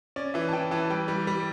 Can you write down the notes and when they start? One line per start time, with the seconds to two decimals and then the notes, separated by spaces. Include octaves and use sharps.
0.16 C#4 D5
0.34 E3 E5
0.48 A5
0.53 E3 G5
0.71 E3 A5
0.90 G3 G5
1.08 G3
1.27 G3